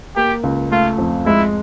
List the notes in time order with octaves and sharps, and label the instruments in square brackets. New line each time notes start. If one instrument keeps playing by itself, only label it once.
[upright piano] A#3 [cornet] G4
[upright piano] C#2
[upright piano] A3 [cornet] F4
[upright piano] F2
[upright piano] G#3 [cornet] E4